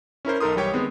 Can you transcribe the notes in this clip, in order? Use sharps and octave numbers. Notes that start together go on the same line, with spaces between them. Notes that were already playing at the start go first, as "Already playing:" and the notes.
C#4 E4 A#4 C5
B1 D#4 A4 A#4 C6 D#6
B1 E3 G3 G4 C#5 G5
D#3 G#3 B3 C4